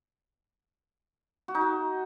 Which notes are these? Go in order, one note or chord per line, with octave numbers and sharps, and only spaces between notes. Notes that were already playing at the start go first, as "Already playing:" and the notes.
F#4
D#4
F#4